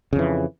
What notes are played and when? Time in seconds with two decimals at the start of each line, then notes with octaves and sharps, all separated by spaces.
0.13 C#3
0.16 F2
0.19 E3